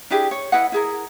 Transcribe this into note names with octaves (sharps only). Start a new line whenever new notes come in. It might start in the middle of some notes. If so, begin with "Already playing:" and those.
D4 E4 G4 G#4
C#5
E4 B4 D#5 F#5
E4 G#4 A#4